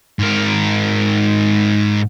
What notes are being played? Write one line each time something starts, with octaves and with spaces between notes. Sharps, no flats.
G#2 A#4